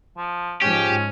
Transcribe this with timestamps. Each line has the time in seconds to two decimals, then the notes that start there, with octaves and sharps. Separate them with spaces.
0.17 F3
0.62 G#2 F3 C#4 G4